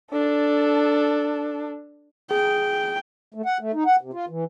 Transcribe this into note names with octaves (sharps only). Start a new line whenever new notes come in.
D4 A4
G#4 G5
A3
F#5
A3
D#4
F#5
C3
F4
E3